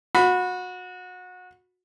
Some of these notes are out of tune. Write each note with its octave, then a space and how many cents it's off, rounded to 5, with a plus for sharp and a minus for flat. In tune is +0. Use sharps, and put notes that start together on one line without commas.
F#4 -25 B5 +0